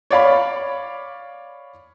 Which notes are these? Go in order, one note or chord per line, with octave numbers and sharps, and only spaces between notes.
C#5 D5 F5 B5